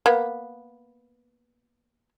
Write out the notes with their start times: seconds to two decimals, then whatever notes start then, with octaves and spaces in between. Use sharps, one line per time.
0.06 A#3 B3